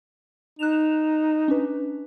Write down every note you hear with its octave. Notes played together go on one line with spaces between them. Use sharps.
D#4 F#6 E7 F7
C#4 D4 B4